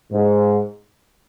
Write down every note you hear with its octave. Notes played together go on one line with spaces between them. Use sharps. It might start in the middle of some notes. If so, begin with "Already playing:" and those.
G#2